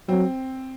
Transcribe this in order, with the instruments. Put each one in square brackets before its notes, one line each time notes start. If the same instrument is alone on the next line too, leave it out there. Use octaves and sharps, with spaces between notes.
[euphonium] F#3 [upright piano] C4